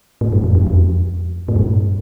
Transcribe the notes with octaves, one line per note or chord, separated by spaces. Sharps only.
A2
G2
F2
F2
F2
A2
G2